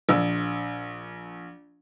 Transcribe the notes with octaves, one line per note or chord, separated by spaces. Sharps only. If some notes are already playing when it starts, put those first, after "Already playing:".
A#1 E6